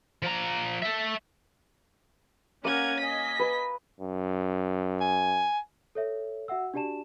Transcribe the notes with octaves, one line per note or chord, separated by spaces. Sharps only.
F3 A#5
A4 E5
A#3 C#4 A#4 F#5 G#6 D#7
D#5 G#5 B6
B4
F#2
G#5
A4 C#5 E5
F#4 E5 F#5 E6
D4 F#4 G4 D5 A5 E7